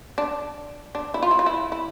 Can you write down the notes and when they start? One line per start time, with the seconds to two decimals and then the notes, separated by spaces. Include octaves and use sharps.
0.18 D4
0.95 D4
1.14 E4
1.23 F4
1.31 E4
1.39 F4
1.46 E4
1.72 E4